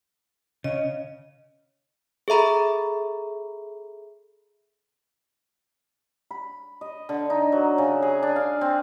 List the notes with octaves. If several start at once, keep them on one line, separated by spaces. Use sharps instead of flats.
C#3 D#5
G#4 A4 E5 A#5 B5
B5
D#5
D3
D#4
F#3
C#3
G#4
D4
F5
C4